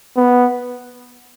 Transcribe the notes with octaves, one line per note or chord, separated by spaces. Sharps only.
B3